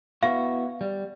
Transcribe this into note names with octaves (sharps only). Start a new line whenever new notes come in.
B3 E4 F#4 F5
G3